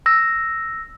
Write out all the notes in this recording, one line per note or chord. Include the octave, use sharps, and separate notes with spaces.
E6 A#6